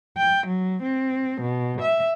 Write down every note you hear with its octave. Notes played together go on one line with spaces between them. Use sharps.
G5
F#3
C4
B2
E5